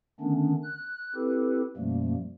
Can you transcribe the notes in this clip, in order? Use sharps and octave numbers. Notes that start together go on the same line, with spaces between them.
D3 D#3 A3 B3 C#4 D4
F#6
C4 E4 G4 A4 B4
F#2 B2 F3 G3 A3 A#3